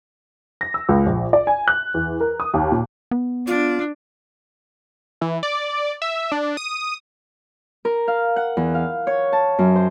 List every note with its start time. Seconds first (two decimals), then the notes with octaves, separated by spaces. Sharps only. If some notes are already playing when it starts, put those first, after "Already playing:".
0.61 A#6
0.74 E6
0.89 C#2
1.06 A#1
1.33 D5
1.47 G#5
1.68 F#6
1.94 E2
2.20 A#4
2.40 D#6
2.54 D#2
2.72 A#2
3.11 B3
3.47 D4 F4
5.21 E3
5.43 D5
6.02 E5
6.32 D4
6.57 D#6
7.85 A#4
8.08 F5
8.36 F#5
8.57 E2
8.74 F5
9.07 C#5
9.33 A5
9.59 F#2
9.76 C5